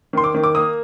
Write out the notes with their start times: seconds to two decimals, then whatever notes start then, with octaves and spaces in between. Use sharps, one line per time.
0.13 D#3 C6
0.24 D6
0.34 D#3
0.44 D6
0.55 A#3 D#6